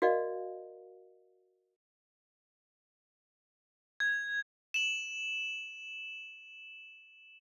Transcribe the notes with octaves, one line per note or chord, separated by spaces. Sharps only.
F#4 A#4 D5 D#5 F5
G#6
E7 F#7